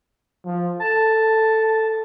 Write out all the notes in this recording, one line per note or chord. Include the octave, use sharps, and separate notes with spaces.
F3
A4 A5